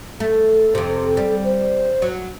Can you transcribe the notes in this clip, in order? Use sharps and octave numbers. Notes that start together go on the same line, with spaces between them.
A3 A4
F2 C3
G3
C5
F#3